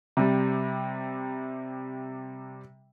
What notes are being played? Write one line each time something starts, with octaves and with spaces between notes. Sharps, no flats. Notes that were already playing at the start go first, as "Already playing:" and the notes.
C3 G3